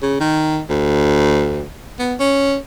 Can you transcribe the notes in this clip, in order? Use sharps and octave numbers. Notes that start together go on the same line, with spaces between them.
C#3
D#3
D2
B3
C#4